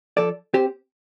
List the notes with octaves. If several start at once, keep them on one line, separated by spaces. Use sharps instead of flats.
F3 A4 D5
C4 G4 C5